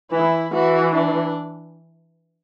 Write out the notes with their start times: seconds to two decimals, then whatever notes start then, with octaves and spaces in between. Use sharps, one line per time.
0.12 E3 E4
0.54 E3 F#4
0.95 D4